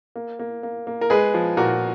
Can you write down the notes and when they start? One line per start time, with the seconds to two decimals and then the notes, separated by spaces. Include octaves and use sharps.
0.16 A#3
0.39 A#3
0.63 A#3
0.87 A#3
1.01 A#4
1.10 G#3 G#4 B4
1.34 F3
1.57 A#2 F#4 A#4